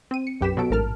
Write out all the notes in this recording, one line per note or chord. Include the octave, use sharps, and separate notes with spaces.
C4 D#7
C#7
B1 F#2 G4 B4 B6 E7
B2 F#3 A4 D7
A1 G#2 A#4 A5 F6